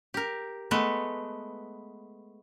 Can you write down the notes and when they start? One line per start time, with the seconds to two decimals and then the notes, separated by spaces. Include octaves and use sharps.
0.14 G4 A#4
0.71 G#3 A3 B3 B4